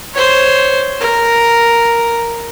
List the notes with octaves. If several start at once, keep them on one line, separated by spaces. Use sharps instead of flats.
C5 C#5
A#4